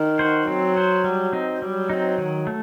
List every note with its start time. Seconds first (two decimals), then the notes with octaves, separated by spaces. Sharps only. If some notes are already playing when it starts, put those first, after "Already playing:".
Already playing: D#3
0.19 F#4 C5
0.48 F#3 C4
0.76 F#4 C5
1.04 G3
1.33 C4 D#4
1.62 F#3 G3
1.90 C4 D#4
2.18 D#3
2.47 A3